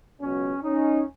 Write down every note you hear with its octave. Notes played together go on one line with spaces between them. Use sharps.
C#2 B2 F#3 C#4
C#4 D#4